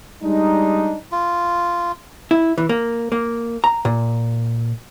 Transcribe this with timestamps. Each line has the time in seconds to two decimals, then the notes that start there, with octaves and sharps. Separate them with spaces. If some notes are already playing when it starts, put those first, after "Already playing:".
0.22 G3 G#3 D4 D#4
1.12 F4
2.31 E4
2.58 E3
2.69 A#3
3.12 A#3
3.64 A#5
3.85 A#2